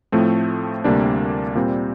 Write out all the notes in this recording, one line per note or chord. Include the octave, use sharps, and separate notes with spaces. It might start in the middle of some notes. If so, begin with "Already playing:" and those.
A2 F3 A3 C4
D2 C3 G3 A#3 D4
A#2 G3 C4